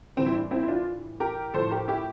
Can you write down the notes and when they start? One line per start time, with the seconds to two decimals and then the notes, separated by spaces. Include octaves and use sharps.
0.16 A2 E3 G3 C4
0.26 E4
0.35 D4
0.51 C4 E4
0.63 E4
0.68 D4 F4
1.20 G4 A#4
1.54 A2 F3 A4 C5
1.71 G4 A#4
1.88 E4 G4